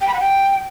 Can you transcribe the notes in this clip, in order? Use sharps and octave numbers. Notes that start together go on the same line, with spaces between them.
G5
B5
F#5
G5